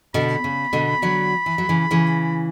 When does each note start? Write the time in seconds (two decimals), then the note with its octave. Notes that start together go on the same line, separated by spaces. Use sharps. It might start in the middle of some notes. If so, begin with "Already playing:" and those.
0.14 B2 D3 B5
0.44 C#3
0.73 B2 D3
1.02 D3 F#3
1.46 E3
1.58 F#3
1.69 C#3 E3
1.91 C#3 E3